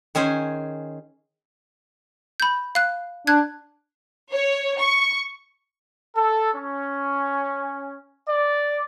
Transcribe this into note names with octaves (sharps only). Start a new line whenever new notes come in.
D#3 C#4 G#4 C5
B5 G6
F5 F#6
D4 F#6 G#6
C#5
C#6
A4
C#4
D5